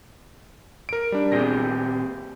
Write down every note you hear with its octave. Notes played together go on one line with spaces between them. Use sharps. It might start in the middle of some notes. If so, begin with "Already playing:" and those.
A#4 D7
G3 D4
A#2 C4 G4 G#4 A#6